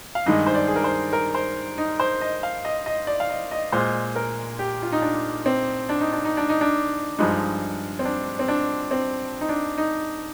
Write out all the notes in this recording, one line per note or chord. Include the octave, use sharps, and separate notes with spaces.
F5
G2 D#3 G#3 D#5
C5
D5
G#4
A#4
C5
A#4
C5
D#4
C5
D#5
F5
D#5
D#5
D5
F5
D#5
D#5
A#2 G#3 C5
A#4
G4
F4
D#4
D4
C4
D4
D#4
D4
D#4
D4
D#4
D4
G2 F3 G#3 D#4
C4
D4
C4
D4
C4
D#4
D4
D#4